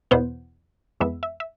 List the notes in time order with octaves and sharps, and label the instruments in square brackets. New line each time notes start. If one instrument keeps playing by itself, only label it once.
[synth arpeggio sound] E2 B2 B3 C5
F2 E3 G#3 B3 E5
E5
E5